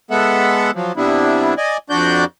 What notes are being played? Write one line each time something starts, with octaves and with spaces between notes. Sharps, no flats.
G#3 B3 A4 E5 F#5
F3 F#3
C3 G3 B3 D4 E4
D5 D#5 G#5
F2 D4 F#4 D5 G6